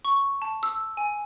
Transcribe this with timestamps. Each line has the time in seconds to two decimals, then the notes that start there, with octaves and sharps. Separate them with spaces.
0.05 C#6
0.42 A5
0.63 E6
0.97 G#5